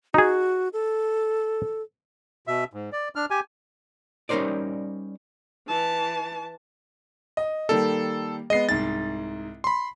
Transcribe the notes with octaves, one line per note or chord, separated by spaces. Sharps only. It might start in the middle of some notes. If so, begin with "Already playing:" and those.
D#4 F#4 G#4
A4
B2 E5
G#2
D5
D4 F6
G4 G#5
G3 C#4 D#4 A#4 C5 D5
E3 A5
D#5
D#3 G3 A#3 A4
G#3 B3 D#5 C7
C2 G#2 A6
B5 C6